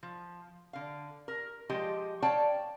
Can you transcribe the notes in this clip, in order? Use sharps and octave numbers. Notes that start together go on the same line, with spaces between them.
F3
D3 F5
A#4
F3 G#3 G4 D#5
C#5 D5 F5 G5 A5